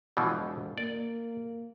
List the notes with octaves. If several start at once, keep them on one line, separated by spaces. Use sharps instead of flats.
E1 B2 E3 F3
A#3 D5